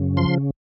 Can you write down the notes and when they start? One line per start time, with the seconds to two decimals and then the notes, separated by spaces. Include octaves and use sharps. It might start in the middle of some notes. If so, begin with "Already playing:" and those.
Already playing: F#2 C#3
0.17 F3 C6